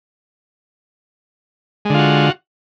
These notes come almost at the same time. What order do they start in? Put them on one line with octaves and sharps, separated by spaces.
G#3 D3 F4 F#4